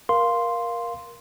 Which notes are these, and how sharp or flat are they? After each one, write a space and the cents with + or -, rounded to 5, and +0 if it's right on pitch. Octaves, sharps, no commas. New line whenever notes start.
A#4 +15 F5 +0 C6 +0